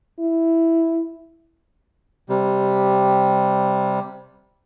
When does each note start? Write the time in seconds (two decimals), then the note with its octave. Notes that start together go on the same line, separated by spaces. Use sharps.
0.19 E4
2.29 C3 G3